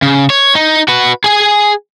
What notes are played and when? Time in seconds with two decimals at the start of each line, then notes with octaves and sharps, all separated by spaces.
0.02 C#3
0.30 C#5
0.55 D#4
0.88 F#4 B4
1.24 G#4 G#5